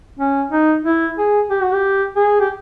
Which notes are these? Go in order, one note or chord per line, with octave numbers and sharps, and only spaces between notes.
C#4
D#4
E4
G#4
G4
F#4
G4
G#4
G4